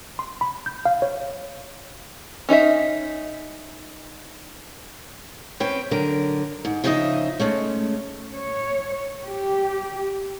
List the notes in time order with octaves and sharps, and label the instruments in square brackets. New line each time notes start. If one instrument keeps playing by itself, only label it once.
[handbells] C6
B5
G6
F5
C#5
[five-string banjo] C#4 D#4 D#5 E5
[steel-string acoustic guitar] C4 C#4 B4 G5
D3 F#3 A#4
G#2
C#3 F3 D#4 F4 D#5 E5
G#3 A3 C#4
[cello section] C#5
G4